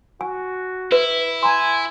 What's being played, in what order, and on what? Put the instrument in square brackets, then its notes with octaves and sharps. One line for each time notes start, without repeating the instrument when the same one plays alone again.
[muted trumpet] F#4 [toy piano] G#5
[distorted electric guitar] E4 [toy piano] B4
[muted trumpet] G#5 [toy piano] A#5 C6